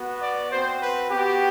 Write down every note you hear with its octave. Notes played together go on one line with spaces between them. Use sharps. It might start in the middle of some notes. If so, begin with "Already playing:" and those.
Already playing: B3 F#4
D5
C4 F#4 C5
B4
B3 F#4 G4